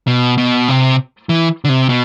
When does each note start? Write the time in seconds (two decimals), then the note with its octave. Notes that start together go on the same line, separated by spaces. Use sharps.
0.07 B2
0.38 B2
0.68 C3
1.29 E3
1.65 D3
1.69 C3
1.89 B2